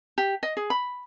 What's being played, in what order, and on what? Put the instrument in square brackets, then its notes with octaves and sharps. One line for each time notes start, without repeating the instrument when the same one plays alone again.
[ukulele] G4
D#5
G#4
B5